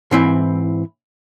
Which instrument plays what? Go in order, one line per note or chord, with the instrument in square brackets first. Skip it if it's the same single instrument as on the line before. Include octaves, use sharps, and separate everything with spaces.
[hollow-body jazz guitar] G#2 E3 C4 E4